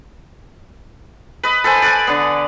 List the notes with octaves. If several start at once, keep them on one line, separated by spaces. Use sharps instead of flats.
B4 D#5
A4 B4 C5 G#5
D5 F#5 G#5
D3 B3